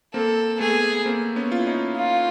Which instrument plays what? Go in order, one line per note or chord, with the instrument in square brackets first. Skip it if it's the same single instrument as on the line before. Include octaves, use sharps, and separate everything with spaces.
[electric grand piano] A#3 C4 [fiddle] A4
[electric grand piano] A3 B3 [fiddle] G#4
[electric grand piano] A#3 C4
B3 C#4
F4
E4
C#4 D#4
[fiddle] F4